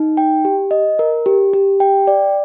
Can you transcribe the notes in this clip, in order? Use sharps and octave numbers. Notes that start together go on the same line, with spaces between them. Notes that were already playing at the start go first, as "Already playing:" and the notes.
Already playing: D#4
G5
G4
D#5
A#4
G4
G4
G5
D5